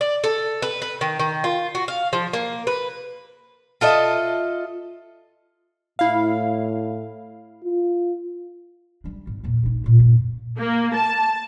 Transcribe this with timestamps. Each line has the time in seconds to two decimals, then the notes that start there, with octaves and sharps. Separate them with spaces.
0.01 D5
0.24 A4
0.62 B4
0.82 B4
1.01 D#3
1.20 D#3
1.44 F4
1.75 F#4
1.88 F5
2.13 F3
2.33 A#3
2.67 B4
3.81 F4 A4 D#5 E5
5.99 A2 E4 F5
7.64 F4
9.04 G3 D4
9.27 G#1
9.44 E2 A#2
9.63 A#1 D#4
9.84 A#2 C#3
9.99 F#2 A#2
10.59 A#3
10.96 A5